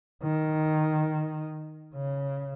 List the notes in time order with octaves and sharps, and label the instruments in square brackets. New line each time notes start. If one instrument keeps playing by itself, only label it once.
[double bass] D#3
C#3